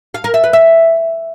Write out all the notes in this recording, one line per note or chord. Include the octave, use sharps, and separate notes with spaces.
F5
A#4
E5
B4
E5